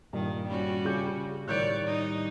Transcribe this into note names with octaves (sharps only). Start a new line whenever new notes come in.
G2 A#2 D#3
G3 C#4 F#4
C#3 F4 G4 G6
A2 D#3 G3 C#5 D5 F#6 G6 D7
D#4